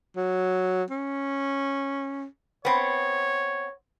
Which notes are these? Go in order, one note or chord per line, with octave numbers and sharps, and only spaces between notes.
F#3
C#4
B3 C4 C#5